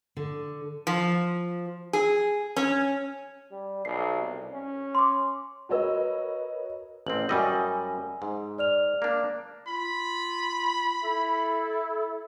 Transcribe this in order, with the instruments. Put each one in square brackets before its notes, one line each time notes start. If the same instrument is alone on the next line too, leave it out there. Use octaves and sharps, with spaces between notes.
[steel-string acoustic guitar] D3
[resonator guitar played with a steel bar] F3
G#4
C#4
[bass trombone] G3
[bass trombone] B1 [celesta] C7
[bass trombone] C2
C#4
[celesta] C6 D6
[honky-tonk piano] F#4 A#4 B4 C#5 D#5 E6
[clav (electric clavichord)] A1 C4 [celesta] F#7
[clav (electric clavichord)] F#2 G3 D#5 [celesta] G#5 E6
[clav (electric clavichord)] G#2
[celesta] D5 F6 F7
[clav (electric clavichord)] A#3 D4
[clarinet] F4 [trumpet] B5
[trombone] E4 [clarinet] A4